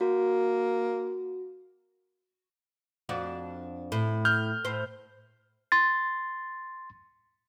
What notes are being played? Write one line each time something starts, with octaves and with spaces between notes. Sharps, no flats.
A#3 F#4
F2 D4 F#4
A2
F6 G6
A2 C5
C6 A6